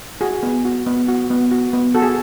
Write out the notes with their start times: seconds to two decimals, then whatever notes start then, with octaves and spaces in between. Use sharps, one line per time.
0.21 F#4 G#4
0.43 B3
0.65 F#4
0.87 B3
1.08 F#4
1.30 B3
1.51 F#4
1.73 B3
1.95 F#4 A4
2.02 G#4